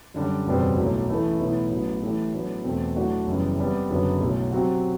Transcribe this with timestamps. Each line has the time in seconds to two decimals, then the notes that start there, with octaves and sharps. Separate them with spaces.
0.14 F#2 D3 G3
0.46 F#1 E2 B2 G3 C4
0.77 B1 A2 F#3 A3
1.09 A1 A2 E3 A3 E4
1.40 B1 A2 E3 B3 E4
1.71 A1 A2 F#3 B3
2.02 A2 E3 A3 E4 G4
2.33 A2 F#3 B3 D4
2.64 E2 B2 A3 C4
2.95 A2 F#3 A3 D4 F#4
3.27 F#1 F#2 E3 G3 B3
3.58 C3 G3 B3
3.90 F#1 F#2 D3 F#3 B3
4.21 B1 A2 F#3
4.52 C3 F#3 C4 F#4